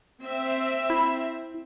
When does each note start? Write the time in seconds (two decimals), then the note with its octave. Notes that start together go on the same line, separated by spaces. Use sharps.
0.25 C4 E5
0.90 E4